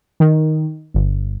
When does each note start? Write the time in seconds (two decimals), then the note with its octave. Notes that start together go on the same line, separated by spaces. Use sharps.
0.20 D#3
0.94 G1